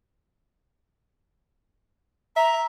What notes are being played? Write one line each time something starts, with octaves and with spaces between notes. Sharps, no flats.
E5 A#5